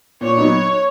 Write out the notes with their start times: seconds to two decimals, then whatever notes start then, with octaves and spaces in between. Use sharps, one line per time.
0.21 A#2 C#5
0.37 F#3 B3 D#4